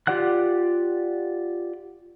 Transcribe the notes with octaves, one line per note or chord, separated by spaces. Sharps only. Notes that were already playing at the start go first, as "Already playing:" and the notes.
F4 G4 D5 F#5 F#6